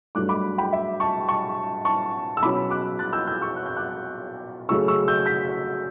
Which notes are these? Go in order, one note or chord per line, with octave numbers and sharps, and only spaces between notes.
G2 F#3 A3 D4 D6 F#6
B5 D6
G5 B5
E5
A5 C#6
A5 C#6
A5 C#6
E6
B2 F#3 C#4 B5 D6
D6 F#6
F#6 A6
E6 G6
E6 G6
C#6 E6
F#6
G6
D6 F#6
C#3 F#3 A3 C#4 C#6 E6
C#6 E6
E6 G6
G6 B6